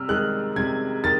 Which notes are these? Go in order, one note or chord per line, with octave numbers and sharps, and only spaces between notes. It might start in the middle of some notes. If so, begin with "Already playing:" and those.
Already playing: C3 E6 F6
D#3 G#3 F#6
C3 G#6
D#3 A6